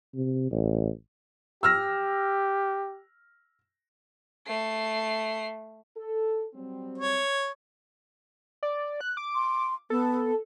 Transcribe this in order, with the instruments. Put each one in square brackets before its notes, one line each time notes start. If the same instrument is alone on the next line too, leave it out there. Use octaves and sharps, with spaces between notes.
[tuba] C3
A1
[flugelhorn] G4 [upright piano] E6 F6 A#6
[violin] A3 C7
[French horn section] A4
F#3 G3 C4
[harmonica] C#5
[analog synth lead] D5
F#6
D6
[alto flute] C6
[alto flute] B3 [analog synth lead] A4